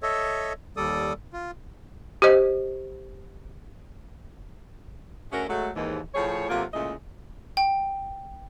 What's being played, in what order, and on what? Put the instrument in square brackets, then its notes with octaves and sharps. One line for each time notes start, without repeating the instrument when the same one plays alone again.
[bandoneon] A4 C#5 D#5 E5
D#2 G3 A4 D5 D#6
F4
[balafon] G4 C5 D#5
[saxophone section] D2 C#4 F#4 G#4 A#4 E5
F#3 G#3 A3
D#2 G#2 E3
A2 F3 G#4 C#5
C3 F#3 A3 A#3 F4
A#2 C#3 G#3 A3 E4 D#5
[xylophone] G5